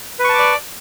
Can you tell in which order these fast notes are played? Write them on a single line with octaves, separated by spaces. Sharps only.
B4 C#6 A5 D6 D5